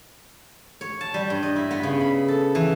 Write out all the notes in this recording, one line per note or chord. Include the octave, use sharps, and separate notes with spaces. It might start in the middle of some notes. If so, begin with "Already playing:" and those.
C#5
A5
G3
G2
D#5
E4
B3
C#3
B5
A4
E3